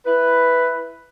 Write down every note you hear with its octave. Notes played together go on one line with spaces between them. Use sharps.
E4 B4